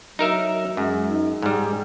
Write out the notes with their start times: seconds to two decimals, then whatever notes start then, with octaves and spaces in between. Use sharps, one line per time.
0.19 F#3 D#4 A#4 E5
0.77 F#2 G#3
1.09 D#4
1.42 G#2 G3